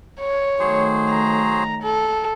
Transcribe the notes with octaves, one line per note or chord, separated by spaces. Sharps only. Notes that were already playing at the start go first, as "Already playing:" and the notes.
C#5
D#3 F#3 A3 G#4 C5
A#5
A4